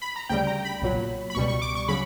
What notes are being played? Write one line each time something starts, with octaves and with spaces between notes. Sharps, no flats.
B5
A#5
D2 C#3 G3 G5
A#5
B5
B1 A#2 F#3
B5
C#2 B2 G3 C#6
C#6
D6
C#6
C#3 F#3 B5